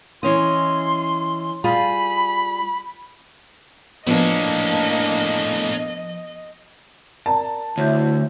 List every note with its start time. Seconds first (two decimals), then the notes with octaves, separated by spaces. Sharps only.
0.23 E3 C#4 D#5 C6
1.64 G3 F4 G#4 B5
4.07 A2 F3 A#3 B3 C#4 D4 D#5
7.26 A#4 D5 A5 A#5
7.78 D2 E4 C#5 E5 G6